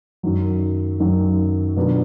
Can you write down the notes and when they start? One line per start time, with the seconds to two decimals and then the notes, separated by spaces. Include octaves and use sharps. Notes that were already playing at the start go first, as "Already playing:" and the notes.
0.23 F#2 D#3 F#3
1.00 F#2 D#3 F#3
1.76 B2 F#3 B3 D4 F4